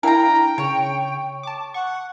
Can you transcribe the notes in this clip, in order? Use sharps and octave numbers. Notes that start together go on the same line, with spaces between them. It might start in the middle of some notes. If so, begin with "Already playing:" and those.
D4 E4 A#4 F5 G5 A#5
C#3 C#5
A5 D6
F#5 C#6